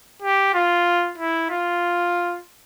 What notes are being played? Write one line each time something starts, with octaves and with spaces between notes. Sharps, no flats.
G4
F4
E4
F4